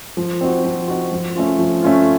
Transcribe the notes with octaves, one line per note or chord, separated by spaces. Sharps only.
F3
C4 D#4 F#4
F3
C4 D#4 F#4
F3
A3 C#4 F4
F3
A3 C#4 F4